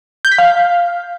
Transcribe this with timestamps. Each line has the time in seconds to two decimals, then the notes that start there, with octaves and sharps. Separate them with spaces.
0.25 G6
0.32 B6
0.38 F5